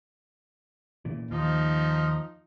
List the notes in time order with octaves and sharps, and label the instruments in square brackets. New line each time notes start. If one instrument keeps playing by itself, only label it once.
[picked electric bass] A#2 E3
[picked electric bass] D#2 [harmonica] F3 D#4 F4